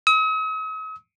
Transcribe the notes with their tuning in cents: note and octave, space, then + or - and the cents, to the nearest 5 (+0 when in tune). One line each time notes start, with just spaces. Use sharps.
D#6 +45